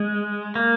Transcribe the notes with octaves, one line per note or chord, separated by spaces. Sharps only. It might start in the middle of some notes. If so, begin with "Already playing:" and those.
Already playing: G#3
A#3